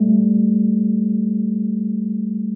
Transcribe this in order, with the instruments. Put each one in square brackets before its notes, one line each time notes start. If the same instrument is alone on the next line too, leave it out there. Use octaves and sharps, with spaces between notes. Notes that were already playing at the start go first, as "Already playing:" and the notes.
Already playing: [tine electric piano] G3 A3